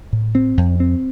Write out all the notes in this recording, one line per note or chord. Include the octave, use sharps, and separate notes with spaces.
A2
C4
F2
C4